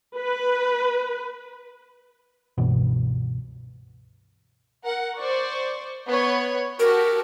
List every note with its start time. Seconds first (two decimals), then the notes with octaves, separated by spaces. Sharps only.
0.17 B4
2.58 C#2 G2 B2 E3
4.84 A#4 F#5
5.18 C5 D5 C#6
6.07 B3 C#5 B5
6.79 F#4 G4 A4 A#4